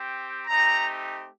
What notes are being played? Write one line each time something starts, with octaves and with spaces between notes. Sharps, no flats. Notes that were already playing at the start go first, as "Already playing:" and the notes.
Already playing: C4 G4
A3 C4 D#4 G4 A#5